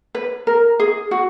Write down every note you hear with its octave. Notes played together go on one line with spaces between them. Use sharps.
B4
A#4
G#4
F#4